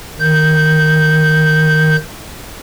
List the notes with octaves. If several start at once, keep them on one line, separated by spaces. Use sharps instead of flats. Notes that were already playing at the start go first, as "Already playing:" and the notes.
D#3 G6